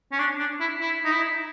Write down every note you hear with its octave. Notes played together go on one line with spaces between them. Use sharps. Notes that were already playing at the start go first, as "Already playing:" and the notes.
C#4
D4
D4
E4
E4
D#4
E4